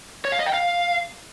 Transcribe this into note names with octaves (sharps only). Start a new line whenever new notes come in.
C#5
F5
D#5
G5
F5